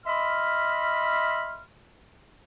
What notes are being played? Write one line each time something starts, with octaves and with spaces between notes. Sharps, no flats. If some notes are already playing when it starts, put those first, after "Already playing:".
D#5 E5 B5 C6 F6